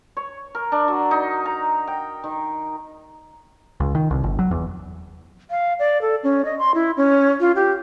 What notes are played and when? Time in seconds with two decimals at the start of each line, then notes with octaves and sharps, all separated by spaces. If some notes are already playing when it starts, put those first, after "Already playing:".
0.17 C#5
0.55 A#4
0.72 D4
0.88 F#3
1.11 D#4
1.46 A#5
1.87 G5
2.24 D#3
3.80 C#2
3.95 D#3
4.11 C2
4.24 G1
4.39 F#3
4.51 E2
5.51 F5
5.79 D5
6.02 A4
6.24 C#4
6.45 D#5
6.59 C6
6.75 E4
6.97 C#4
7.40 F4
7.56 G4